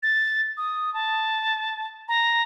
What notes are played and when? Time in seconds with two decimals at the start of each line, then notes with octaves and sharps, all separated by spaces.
0.03 A6
0.57 D#6
0.94 A5
2.08 A#5